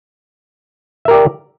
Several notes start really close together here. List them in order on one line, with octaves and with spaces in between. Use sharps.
E5 A#4 G4 D5